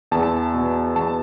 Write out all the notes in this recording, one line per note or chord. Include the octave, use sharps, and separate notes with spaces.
E2 A5
B2
E2 A5